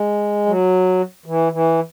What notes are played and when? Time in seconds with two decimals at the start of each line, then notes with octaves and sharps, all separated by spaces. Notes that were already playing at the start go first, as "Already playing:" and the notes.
Already playing: G#3
0.46 F#3
1.26 E3
1.52 E3